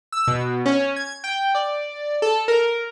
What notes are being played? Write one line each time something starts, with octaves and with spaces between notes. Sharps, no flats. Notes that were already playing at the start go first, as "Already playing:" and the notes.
E6
B2
C#4
G#6
G5
D5
A4
A#4